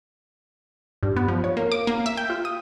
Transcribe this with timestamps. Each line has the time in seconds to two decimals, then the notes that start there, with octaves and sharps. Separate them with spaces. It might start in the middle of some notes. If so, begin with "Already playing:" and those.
1.03 G2
1.17 B3
1.28 F3
1.44 C#5
1.57 A#3
1.72 D6
1.87 A#3
2.06 E5
2.17 G5
2.30 F4
2.45 D#6